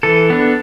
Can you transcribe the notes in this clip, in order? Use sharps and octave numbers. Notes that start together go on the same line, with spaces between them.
E3 A4
B3 D4